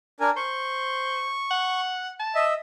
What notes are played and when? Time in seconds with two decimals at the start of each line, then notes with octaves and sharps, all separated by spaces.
0.20 D4 A#4 G#5
0.37 C5 C#6
1.51 F#5
2.19 A5
2.35 D#5 E5